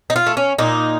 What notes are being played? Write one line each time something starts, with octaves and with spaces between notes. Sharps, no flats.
D#4
F4
A3
C#4
A#2 D#4